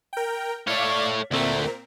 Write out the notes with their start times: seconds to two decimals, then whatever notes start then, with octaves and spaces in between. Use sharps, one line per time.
0.13 A#4 G5
0.67 A3 C#5 D5 F5
1.31 D2 A#2 A3 C4 A#4